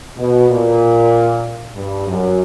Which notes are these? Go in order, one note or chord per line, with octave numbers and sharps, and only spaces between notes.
B2
A#2
G2
F#2